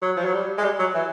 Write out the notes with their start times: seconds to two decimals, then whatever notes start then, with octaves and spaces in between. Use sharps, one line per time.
0.02 F#3
0.17 F3
0.25 F#3
0.33 G3
0.58 G#3
0.64 G3
0.79 F#3
0.95 E3